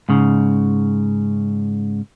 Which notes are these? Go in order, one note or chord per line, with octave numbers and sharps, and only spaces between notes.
G#2 C#3